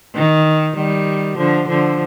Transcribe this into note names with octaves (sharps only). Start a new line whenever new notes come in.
D#3
D#3 G3
D3 F3
D3 F3